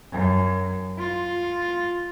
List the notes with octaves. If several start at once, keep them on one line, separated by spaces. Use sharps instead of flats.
F#2
F4